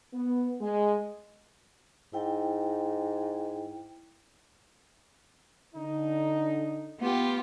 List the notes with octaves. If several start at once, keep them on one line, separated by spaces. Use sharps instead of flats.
B3
G#3
G#2 E4 G5
D3 D#4
B3 F4 G4